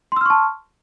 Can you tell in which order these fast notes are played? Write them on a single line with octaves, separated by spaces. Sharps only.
C6 E6 F6 C#6 A5